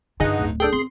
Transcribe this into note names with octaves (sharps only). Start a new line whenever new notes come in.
G2 D3 D#4 F4 G#4 D#5 F#5
D1
D4 G#4 A4 G5
C4 C6